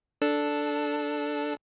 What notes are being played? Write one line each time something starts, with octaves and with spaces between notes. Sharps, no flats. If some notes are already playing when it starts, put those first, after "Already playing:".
D4 A4